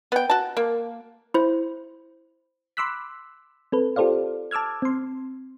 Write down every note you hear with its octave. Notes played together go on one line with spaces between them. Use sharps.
B3 G5
F#4 A5
A#3
E4 C5
B5 C6 D6 E6 F#6 B6
C4 A4 B4
F4 G4 A4 C5 D5 F5
A5 D6 E6 F6 G#6
C4 C6